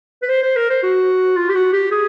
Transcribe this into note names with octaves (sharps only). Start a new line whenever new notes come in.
B4
C5
C5
A#4
C5
F#4
F4
G4
F#4
G4
G#4